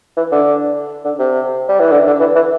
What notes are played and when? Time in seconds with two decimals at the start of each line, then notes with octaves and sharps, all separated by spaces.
0.17 E3
0.32 D3
1.04 D3
1.19 C3
1.69 G3
1.80 E3
1.92 D3
2.06 D3
2.20 E3
2.35 E3